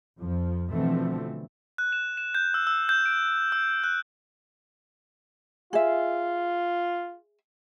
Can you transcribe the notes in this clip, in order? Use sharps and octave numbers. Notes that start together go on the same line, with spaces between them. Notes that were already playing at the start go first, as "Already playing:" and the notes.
F2 F3
B2 D3 E3 F3 A3 C4
F#6
E7
E7
G6
E6
E6
G6
D7
E6
F#6
F4 G#4 E5